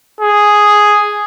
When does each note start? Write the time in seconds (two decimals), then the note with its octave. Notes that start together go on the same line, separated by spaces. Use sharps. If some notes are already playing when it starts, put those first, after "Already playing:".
0.21 G#4